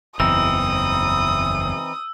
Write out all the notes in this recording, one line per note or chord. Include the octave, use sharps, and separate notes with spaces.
F#1 E2 E3 C4 D#4 D#6 E6